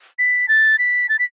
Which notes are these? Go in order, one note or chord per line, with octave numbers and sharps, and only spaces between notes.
B6
A6
B6
A6
B6